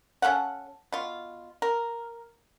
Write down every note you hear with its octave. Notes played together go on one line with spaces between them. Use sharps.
C#4 A4 F5 F#5
B2 F4
A#4